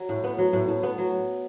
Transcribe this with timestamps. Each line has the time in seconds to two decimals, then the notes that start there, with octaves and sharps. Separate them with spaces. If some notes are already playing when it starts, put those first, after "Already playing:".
Already playing: F#3
0.09 A2
0.24 B3
0.38 F#3
0.53 A2
0.68 A2
0.83 B3
0.98 F#3